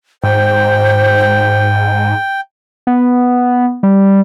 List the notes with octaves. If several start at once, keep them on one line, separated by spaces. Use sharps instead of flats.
G#2 C5 G5
B3
G3